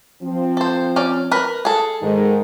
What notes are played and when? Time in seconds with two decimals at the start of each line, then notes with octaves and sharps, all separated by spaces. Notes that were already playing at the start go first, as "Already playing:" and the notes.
0.23 F3 C4
0.57 A4 C5
0.96 C#4 D5
1.31 A#4 B4
1.65 G#4 A4
2.02 G#2 D#3 G#3